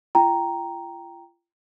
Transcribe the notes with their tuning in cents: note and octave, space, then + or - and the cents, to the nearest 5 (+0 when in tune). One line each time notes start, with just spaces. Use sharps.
F4 -35 G5 +0 A#5 +0